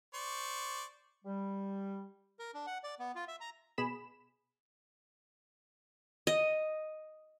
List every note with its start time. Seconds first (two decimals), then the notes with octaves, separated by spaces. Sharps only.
0.14 C5 D5 C#6
1.24 G3
2.39 A#4
2.54 D4
2.67 F#5
2.84 D5
2.99 B3
3.15 F4
3.28 E5
3.41 A#5
3.78 B2 G#4 B5 E7
6.27 D#5